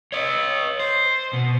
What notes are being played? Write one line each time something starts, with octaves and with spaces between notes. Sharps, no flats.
C#5 D#5
C5
B2